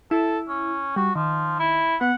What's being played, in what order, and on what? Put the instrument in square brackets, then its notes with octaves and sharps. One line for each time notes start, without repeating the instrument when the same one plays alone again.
[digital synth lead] E4 [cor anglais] A4
[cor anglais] C#4
[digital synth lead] G3 [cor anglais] F#4
[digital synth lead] D#3 [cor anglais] F3
[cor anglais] E4
[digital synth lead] B3 [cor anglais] F#5